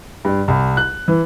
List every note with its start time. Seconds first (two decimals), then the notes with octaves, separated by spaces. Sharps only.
0.25 G2
0.48 C2
0.77 F#6
1.08 E3